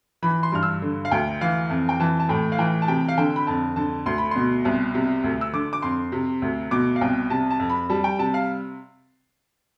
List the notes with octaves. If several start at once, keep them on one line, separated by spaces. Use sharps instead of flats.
E3 B5
C6
G2 F6
E6
D3
F5
D2 G5
E3 F5
F2
G5
E3 A5
A5
A2 G5
F5
E3 G5
A5
C3 G5
F5
D3 G5
B5
F2 A5
D3 A5
D2 C6
B5
B2 C6
C2
C3
D2
E6
D3 D6
D6
F2 C6
C3
D2
B2 D6
F5
C2 G5
C3 A5
A5
F2
B5
G3 A5
G5
C3 A5
F5